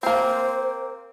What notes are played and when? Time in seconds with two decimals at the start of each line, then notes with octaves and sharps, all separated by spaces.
0.03 A#3 C4 C5